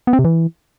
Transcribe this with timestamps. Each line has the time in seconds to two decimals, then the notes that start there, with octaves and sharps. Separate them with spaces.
0.07 B3
0.13 C4
0.19 C3
0.25 E3